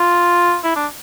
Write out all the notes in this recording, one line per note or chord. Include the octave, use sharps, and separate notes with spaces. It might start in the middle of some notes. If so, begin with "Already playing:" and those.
Already playing: F4
E4
D4